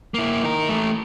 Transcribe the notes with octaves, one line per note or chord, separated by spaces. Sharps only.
A#3 E4
D#4 A#4
E3 A3